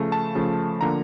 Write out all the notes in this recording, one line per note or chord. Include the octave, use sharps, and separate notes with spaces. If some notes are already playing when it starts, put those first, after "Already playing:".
Already playing: C#3 F3 A3
A5
C#3 F3 A3
D3 F3 A#3 A#5